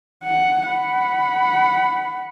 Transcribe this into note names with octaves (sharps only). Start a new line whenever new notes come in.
F#5
F#5 B5